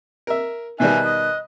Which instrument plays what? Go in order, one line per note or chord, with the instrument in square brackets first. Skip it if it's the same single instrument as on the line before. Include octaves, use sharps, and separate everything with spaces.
[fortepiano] A#4 E5
[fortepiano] B2 D#3 G3 [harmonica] D#4 E5 G#5 [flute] F#6
[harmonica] D#5